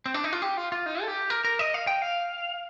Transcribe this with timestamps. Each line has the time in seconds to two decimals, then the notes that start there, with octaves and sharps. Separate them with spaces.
0.06 C4
0.14 D4
0.24 D#4
0.33 F4
0.42 G4
0.57 F4
0.72 F4
0.86 D#4
1.02 A4
1.08 G4
1.30 A#4
1.45 A#4
1.59 D#5
1.74 F5
1.87 G5
2.02 F5